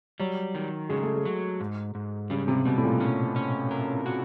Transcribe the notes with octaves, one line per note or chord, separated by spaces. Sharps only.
F#3 G3
D#3
C#3 G#3
A3
G#3
F#3
G#2
G#2
C#3 G3
C3
B2 G3
A2
A#2
C#4
C#4
A#4
F#4